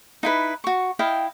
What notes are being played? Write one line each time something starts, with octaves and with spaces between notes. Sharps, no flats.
D#4 E4 B4
F#4 C#6
E4 D#5 F5 G5